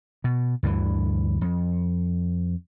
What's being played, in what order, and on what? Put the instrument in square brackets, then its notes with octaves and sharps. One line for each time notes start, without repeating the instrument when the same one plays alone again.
[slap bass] B2
D2 G2 D3 E3
F2